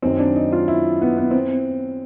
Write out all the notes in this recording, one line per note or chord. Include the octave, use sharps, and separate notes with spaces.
F#2 D#3 F#3 C4
D4
D#4
F4
E4
B3
B3
C4